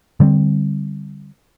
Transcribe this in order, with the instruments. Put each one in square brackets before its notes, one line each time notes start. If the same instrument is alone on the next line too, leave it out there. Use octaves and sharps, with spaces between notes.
[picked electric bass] D3 G3 B3 C4